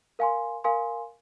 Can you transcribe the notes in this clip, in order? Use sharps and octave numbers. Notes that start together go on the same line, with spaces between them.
A#4 F5 G#5 C6
A#4 F5 G#5 C6